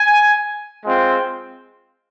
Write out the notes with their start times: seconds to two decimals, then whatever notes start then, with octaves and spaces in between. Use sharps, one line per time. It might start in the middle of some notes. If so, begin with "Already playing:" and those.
Already playing: G#5
0.84 G#3 C4 F4